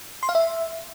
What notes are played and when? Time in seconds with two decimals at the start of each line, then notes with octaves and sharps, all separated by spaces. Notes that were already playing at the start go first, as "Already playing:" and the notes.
0.23 C6
0.29 F5
0.35 E5